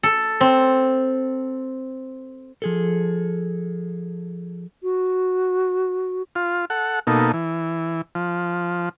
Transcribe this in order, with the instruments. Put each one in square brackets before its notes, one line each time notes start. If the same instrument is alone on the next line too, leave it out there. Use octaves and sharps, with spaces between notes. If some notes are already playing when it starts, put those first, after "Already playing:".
[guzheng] A4
C4
[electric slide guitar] F3 G#4 A4
[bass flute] F#4
[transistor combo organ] F4
A4 F#5
B2 A#3 D#4 A4
E3
F3